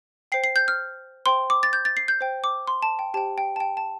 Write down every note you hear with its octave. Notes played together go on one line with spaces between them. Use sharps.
C5 G5 C7
C7
G6
F6
C5 G5 C6
D6
A6
G6
A6
C7
G6
C5 G5
D6
C6
A5
G5
G4 C5 G5 A5
G5
A5
G5
A5